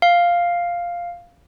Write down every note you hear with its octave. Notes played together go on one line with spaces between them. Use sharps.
F5